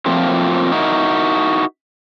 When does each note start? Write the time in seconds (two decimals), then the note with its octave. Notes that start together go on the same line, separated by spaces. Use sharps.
0.06 F3 F#3 A3 A#3 C4 F4
0.72 D#4 E4 F#4 A#4